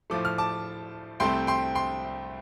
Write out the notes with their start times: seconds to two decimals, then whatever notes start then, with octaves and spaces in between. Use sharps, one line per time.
0.10 A2 F3 A3 D6
0.25 F6
0.38 A5 D6
1.20 C2 C3 A3 C4 G5 C6
1.47 G5 C6
1.75 G5 C6